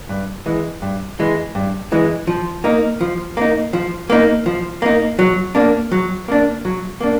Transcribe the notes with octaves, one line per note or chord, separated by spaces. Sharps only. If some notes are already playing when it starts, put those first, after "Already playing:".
G2
E3 G#3
G2
E3 G#3
G2
E3 G#3
F3
A#3 D#4
F3
A#3 D#4
F3
A#3 D#4
F3
A#3 D#4
F#3
A#3 D4
F#3
A#3 D4
F#3
A#3 D4